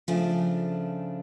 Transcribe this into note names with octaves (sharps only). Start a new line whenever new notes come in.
C#3 F3 A3 D4